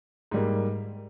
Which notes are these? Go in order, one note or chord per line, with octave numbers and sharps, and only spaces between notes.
G#2 G3 A#3